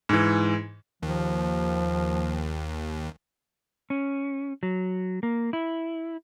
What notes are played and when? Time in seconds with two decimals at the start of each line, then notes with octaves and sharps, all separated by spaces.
0.09 G#2 E3
1.03 D#2 F3
3.90 C#4
4.63 F#3
5.23 A#3
5.53 E4